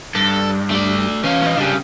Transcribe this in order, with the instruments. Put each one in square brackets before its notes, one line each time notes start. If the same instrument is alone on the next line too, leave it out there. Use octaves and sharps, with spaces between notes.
[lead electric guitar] G2 [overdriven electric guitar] A4
[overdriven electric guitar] A3 D5
[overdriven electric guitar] E3 F5 [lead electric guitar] C#4
[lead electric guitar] C#4 D#5
[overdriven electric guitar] C2 C#3 [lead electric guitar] D4 G4